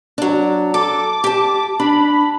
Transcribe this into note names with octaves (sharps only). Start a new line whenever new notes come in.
F#3 D4
A4 D6
G4 A5
D4 B5